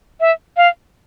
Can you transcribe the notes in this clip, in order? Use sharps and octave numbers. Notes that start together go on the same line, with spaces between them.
E5
F5